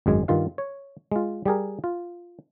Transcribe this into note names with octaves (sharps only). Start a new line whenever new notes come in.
G#1 F#2 G#3 G#5
G2 D#3 F4 F5
C#5
G#3 F4
G3 G4 G#4 A#4
F4